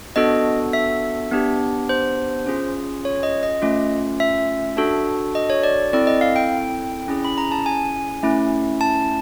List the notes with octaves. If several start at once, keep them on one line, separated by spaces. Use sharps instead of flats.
B3 D4 F#4 A4 D#5
E5
B3 D4 G4
C5
C#4 F4 G#4
C#5
D#5
D#5
A3 C#4 F4
E5
D4 F#4 A4
D#5
C#5
D5
C4 E4 A4 D5
D#5
F5
G5
C#4 E4 G#4
B5
A#5
A5
G#5
A3 C#4 E4
A5